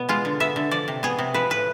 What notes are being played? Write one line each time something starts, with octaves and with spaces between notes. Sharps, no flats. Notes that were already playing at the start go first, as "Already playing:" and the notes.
Already playing: B2 B3
G#3 F4
D3
B3 E5
D3
F3 D5
C3
B3 G#4
C3
F3 B4
A2 B4